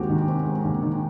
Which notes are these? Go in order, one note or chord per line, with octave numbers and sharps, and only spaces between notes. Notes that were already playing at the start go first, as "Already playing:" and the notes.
Already playing: D#2 G#3 C4 F#4 G4
D#3
C4
G#3
D#2
D#3